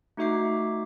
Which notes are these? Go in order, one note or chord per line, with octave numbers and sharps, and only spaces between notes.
A3 D#4 F#4 E5 D6 C7